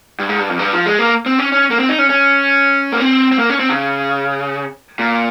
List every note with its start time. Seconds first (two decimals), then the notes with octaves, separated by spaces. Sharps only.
0.19 G2
0.29 G#2
0.39 G2
0.50 F2
0.59 G2
0.73 F3
0.86 G#3
0.99 A#3
1.26 C4
1.39 C#4
1.52 C#4
1.71 A#3
1.80 C4
1.89 D#4
1.99 C#4
2.10 C#4
2.92 A#3
3.00 C4
3.32 C4
3.39 A#3
3.50 C#4
3.59 C4
3.69 C#3
4.99 A#2